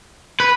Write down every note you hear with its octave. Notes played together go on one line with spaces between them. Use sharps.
B4